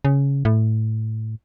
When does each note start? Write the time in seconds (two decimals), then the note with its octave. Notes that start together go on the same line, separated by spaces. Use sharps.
0.05 C#3
0.45 A2